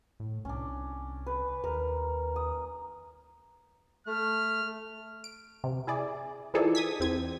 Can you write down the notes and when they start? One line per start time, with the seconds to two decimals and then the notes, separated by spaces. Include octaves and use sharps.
0.20 A2
0.45 C2 C#4 D4
1.26 B4
1.64 D#2 A#4 B4
2.36 D#6
4.07 A3 F6
5.24 D7
5.64 C3
5.87 E4 G#4 D5
6.54 E3 F3 D#4 G#4 A4 D5
6.75 D#6 G#6 B6
7.00 E2 C4 G#6